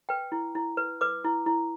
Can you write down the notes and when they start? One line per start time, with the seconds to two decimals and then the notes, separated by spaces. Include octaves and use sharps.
0.09 B4 G5
0.32 E4
0.55 E4
0.77 B4
1.01 B4 D6
1.24 E4
1.46 E4